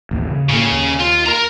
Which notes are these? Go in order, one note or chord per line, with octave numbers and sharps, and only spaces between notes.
A1 D#2
C#3
A2 C#3 A#3
D#2
F4
A#4 A#5